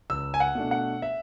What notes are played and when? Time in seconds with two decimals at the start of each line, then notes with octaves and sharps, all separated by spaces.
0.10 C#2 E6
0.34 G#5
0.40 F#5
0.55 B2 A3 D4
0.71 F#5
1.02 E5